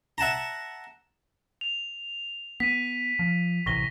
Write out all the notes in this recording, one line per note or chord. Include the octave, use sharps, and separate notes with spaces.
E5 F#5 A5 A#5
F7
B3 B6 D#7
F3
A1 C3 E3 C#6 A#6 G7